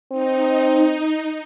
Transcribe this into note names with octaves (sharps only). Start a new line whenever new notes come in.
C4 D#4